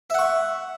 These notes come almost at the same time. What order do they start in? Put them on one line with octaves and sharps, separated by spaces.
E5 F#5 C#6